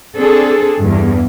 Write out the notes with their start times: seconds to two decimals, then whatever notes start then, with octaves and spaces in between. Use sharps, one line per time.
0.16 C4 D4 G#4 A4
0.80 E2 G2